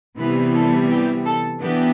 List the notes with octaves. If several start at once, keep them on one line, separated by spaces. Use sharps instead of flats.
C3 E3 G3 B3 B4
A4
G4
A4
E3 B3 D4 G4